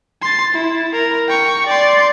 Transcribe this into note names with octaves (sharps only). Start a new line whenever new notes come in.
C6 A6
E4
A#4
G5 C#6
D5 C6